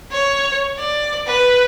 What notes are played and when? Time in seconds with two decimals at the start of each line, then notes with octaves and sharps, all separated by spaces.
0.12 C#5
0.78 D5
1.26 B4